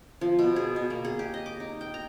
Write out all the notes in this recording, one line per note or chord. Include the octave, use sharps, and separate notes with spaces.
F3
B2
G#4
B2
A#3
G#4
G4
D#5
D6
D#4
G5
A#5